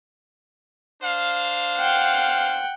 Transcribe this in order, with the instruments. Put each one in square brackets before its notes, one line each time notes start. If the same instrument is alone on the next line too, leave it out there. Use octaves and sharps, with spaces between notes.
[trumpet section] D4 C5 F5
[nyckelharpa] F#5 G5